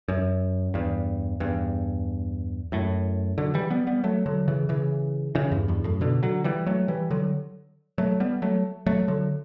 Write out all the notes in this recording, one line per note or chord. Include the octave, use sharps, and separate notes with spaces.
F#2
E2 G2
E2 G2
F#2 A2
D3 F#3
E3 G3
G3 B3
G3 B3
F#3 A3
D3 F#3
C#3 E3
C#3 E3
C#3 E3
E2 G2
E2 G2
F#2 A2
B2 D3
D3 F#3
E3 G3
F#3 A3
E3 G3
D3 F#3
F#3 A3
G3 B3
F#3 A3
F#3 A3
D3 F#3